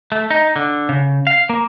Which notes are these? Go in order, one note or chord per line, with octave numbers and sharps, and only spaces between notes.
A3
D#4
D3
C#3
F5
A#3